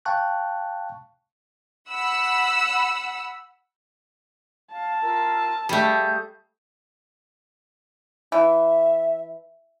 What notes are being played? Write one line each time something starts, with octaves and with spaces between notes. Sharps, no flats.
F5 G5 A5 C#6 F#6
F#5 B5 E6
F5 A5
F4 A#4 E6
G3 A3 G#4 F5 G6
E3 E5